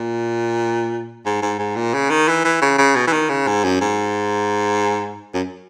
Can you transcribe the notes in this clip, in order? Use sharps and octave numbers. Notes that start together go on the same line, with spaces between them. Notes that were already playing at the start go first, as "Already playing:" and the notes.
Already playing: A#2
G#2
G#2
G#2
A#2
C#3
D#3
E3
E3
C#3
C#3
B2
E3
D#3
C#3
G#2
F#2
G#2
F#2